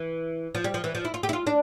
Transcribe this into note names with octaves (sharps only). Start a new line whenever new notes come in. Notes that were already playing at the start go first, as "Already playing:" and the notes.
Already playing: E3
F3
G3
F3
E3
F3
E4
F4
G4
E4
F4
D4